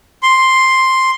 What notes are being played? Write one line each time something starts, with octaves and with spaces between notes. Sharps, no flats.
C6